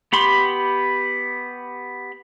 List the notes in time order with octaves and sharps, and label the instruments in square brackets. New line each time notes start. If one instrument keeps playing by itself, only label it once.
[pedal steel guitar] B3 G4 B5 C6